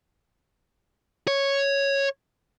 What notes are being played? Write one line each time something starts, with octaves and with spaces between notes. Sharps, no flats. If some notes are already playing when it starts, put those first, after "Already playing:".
C#5